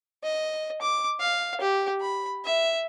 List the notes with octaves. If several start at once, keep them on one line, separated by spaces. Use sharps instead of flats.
D#5
D6
F5
G4
B5
E5